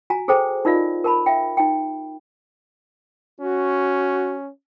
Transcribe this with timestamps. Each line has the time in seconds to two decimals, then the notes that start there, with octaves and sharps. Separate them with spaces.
0.10 F#4 G#5 A#5
0.28 G#4 A4 C5 G5 A#5
0.65 D#4 F4 A#4 D5 D#5 F5
1.04 A#4 A5 B5
1.26 E5 F5 G5
1.57 D#4 G5
3.41 C#4 F#4